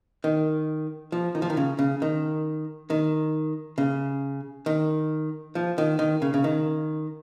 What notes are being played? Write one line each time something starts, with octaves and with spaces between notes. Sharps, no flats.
D#3
F3
D#3
F3
D#3
C#3
C#3
D#3
D#3
C#3
D#3
F3
D#3
D#3
C#3
C#3
D#3